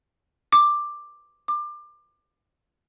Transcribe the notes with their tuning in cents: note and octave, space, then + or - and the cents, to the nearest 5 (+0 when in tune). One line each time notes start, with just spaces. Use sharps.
D6 +10
D6 +25